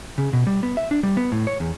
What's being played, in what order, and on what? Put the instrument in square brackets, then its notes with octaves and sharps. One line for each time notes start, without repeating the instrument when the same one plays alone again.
[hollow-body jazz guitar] C#3
B2
G3
B3
E5
D4
G3
B3
A2
C#5
E2